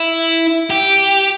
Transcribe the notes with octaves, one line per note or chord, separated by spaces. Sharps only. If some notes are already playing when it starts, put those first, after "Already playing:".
Already playing: E4
G4